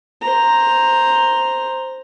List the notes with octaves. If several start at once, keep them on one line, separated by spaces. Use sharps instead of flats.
C5 A#5